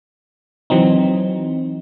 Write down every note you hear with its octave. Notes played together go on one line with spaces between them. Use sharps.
E3 F#3 C4 D#4